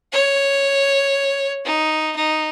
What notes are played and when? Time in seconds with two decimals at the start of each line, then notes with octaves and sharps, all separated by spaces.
0.12 C#5
1.65 D#4
2.16 D#4